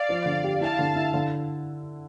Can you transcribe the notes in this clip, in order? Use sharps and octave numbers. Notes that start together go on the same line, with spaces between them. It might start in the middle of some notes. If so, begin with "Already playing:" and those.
Already playing: D5 F5
F3
D3
G4
E4 F5 A5
D3
E4
D3